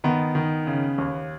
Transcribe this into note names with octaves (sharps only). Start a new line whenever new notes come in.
D#3 B3
D#3
C#3
D#2